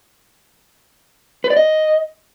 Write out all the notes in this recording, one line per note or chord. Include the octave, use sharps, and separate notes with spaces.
B4
D5
D#5